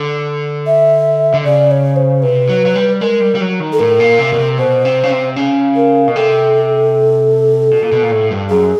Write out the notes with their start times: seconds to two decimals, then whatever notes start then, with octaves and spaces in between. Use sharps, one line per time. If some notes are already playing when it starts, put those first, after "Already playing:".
Already playing: D3
0.67 E5
1.34 D3
1.45 C#3 D5
1.71 C#5
1.96 C5
2.22 C3 B4
2.49 F#3
2.66 F#3
2.75 G3
3.01 G#3 A#4
3.21 G3
3.35 G3
3.41 F#3
3.60 D#3
3.72 A4
3.79 A2 A#4
4.00 A#2
4.19 C3
4.33 B2
4.39 C3
4.58 B2 C5
4.85 C3
5.03 C#3
5.11 C3
5.36 C#3
5.76 A#4
6.08 B2
6.15 C3 A4
7.71 B2
7.83 A#2
7.92 B2
8.02 A#2
8.11 A2
8.31 G2
8.50 F#2 G#4